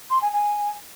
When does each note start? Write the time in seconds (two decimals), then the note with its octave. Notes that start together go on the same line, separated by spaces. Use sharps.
0.10 C6
0.21 G#5
0.33 G#5